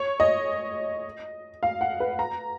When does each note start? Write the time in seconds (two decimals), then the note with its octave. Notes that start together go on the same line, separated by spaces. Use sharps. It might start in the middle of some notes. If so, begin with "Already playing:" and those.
Already playing: C#5
0.20 D#5
1.63 F5
1.81 F#5
2.00 B4
2.19 A#5